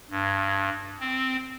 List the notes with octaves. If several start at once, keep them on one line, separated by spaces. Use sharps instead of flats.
G2
C4